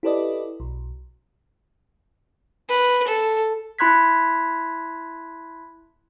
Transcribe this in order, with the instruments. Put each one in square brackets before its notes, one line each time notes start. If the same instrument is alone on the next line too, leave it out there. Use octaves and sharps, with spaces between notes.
[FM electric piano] E4 G4 A4 B4 D5 D#5
B1
[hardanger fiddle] B4
A4
[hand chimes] E4 B5 C6 F#6 G#6 B6